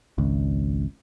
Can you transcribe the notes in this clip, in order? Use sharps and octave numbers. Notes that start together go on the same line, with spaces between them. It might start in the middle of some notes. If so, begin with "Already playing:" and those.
G#1 C#2